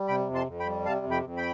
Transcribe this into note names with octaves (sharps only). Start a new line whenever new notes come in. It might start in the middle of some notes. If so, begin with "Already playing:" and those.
Already playing: G3
C3 G5 B5
F2
A5 C6
F2
G5 B5
G3
C3 F5 A5
F2
G5 B5
F2
G5 B5